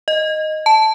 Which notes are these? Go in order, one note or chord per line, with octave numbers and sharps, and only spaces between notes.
D#5
A5